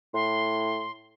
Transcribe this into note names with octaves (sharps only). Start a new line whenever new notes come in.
A2 C6